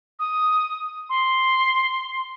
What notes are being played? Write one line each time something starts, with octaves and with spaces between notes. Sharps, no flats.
D#6
C6